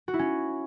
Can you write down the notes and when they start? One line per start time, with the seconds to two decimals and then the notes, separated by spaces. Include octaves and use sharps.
0.08 F#4
0.14 E4
0.19 C#4